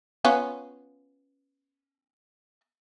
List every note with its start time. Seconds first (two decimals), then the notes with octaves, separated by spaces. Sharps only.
0.25 B3 C#4 F4